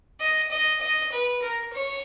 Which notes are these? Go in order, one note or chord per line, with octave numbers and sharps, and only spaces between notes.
D#5
D#5
D#5
B4
A#4
C#5